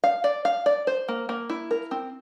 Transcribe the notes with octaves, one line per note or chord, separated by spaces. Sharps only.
F5
D5
F5
D5
C5
A#3
A#3
E4
A#4
C4